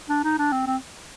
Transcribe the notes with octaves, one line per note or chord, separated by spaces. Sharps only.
D4
D#4
D4
C4
C4